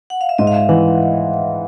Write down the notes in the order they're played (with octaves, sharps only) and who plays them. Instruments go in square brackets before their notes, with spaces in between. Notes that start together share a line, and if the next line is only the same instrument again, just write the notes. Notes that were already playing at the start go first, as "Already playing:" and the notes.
[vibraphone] F#5
F5
E5
[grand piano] G#2 [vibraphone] D#5
[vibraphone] F5
E5
[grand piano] E3 [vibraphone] F#5